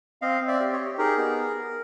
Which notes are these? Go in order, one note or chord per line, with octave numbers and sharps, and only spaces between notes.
C4 D#5 F5
C4
D5 E5
G4
C#5 D#5
G4
D#4 G#4 A#4
B3